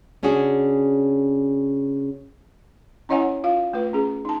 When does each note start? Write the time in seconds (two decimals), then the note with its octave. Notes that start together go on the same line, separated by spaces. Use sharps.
0.23 C#3 C#4 D4 F#4 G#4
3.09 C#4 E4 C#5 D#5 F#5 G#5
3.44 F4 F5
3.73 A3 F4 B4
3.93 C#4 G#4
4.25 D#4 A5